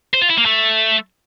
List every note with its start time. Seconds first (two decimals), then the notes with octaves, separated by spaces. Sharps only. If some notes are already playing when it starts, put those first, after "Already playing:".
0.14 C5
0.22 F4
0.30 E4
0.38 A#3
0.45 A3